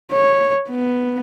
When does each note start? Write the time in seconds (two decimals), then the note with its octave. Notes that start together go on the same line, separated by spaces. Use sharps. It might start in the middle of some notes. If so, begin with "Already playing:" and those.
0.12 C#5
0.69 B3